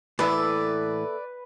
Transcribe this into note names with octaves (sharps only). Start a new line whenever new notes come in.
A2 E3 A#3 A4 B4 D5 E5